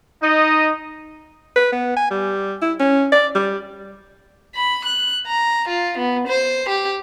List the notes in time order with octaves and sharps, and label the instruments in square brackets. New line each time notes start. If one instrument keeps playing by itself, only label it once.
[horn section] D#4 [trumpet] D#5
[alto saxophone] B4
B3
G#5
G3
E4
C#4
D5
G3
[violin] B5
F#6
A#5
F4
B3
C5
G4